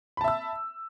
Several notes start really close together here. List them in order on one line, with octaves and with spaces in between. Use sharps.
B5 A5 E5 E6